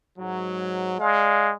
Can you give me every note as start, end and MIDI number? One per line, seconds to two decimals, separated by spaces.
0.18 0.95 44
0.18 0.95 54
0.99 1.54 56
0.99 1.51 74
0.99 1.51 77